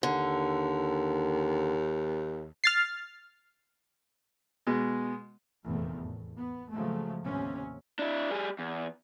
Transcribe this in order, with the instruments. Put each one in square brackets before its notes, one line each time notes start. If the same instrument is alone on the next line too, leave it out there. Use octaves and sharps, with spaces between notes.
[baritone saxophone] D#2 [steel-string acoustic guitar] D3
[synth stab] F6 A6 C7
[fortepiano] B2 G#3
[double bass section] F1 E2 A#2 D#3 A3
A2
B3
A#2 C#3 F3 F#3 G#3 A3
D#2 A2 C3 B3 C#4
[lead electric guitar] D4 E4
G3 G#4
E2